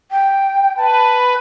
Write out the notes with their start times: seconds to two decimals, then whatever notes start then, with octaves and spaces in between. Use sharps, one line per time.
0.11 G5
0.77 B4 A5